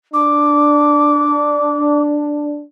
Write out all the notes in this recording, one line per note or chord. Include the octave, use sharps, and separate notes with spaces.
D4 D6